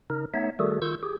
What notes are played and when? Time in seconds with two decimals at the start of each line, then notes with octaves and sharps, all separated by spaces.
0.10 C#3 D#4 A#4
0.34 A3 B3 D#4 C#5 E5
0.59 D#3 G3 A3 F#4 G#4 A4
0.82 D#3 F4 C#6 E6 G6
1.03 G4 G#4